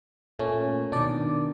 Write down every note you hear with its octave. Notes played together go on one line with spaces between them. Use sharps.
A#2 A3 C#4
B2 D#3 D4 D5